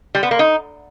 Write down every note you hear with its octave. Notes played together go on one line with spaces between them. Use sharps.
G3
B3
A#3
D#4